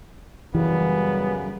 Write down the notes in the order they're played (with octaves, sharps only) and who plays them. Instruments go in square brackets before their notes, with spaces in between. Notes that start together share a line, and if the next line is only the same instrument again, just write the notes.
[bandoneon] F#2 C#3 [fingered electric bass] E3 [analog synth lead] G3 [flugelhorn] B3